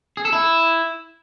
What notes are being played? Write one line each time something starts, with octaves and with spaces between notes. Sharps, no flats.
G#4
A4
E4